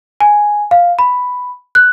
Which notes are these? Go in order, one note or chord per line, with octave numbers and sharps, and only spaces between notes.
G#5
F5
B5
F#6